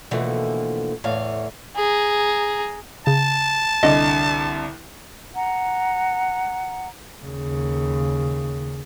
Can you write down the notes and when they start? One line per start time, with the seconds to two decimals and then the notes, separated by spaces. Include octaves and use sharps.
0.11 B2 D3 E3 F3 A3 A#3
1.04 E2 A2 E3 C#5 F5
1.76 G#4 A#5
3.07 C#3 A5
3.83 C2 D3 D#5
5.35 F#5 A#5
7.24 D#2 C#3